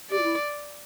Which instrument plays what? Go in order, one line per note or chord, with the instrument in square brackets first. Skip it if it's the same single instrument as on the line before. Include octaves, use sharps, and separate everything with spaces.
[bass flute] G4 [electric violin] D5
[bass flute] F4
E4